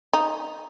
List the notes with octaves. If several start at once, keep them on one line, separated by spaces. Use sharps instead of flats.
D#4